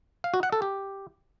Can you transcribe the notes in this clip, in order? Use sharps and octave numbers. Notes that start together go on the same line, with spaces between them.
F5
F#4
F#5
A4
G4